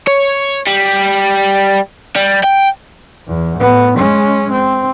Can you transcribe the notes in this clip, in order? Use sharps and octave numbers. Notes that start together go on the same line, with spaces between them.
C#5
G3
G3
G5
E2
A2 B3
G#3 C#4
C4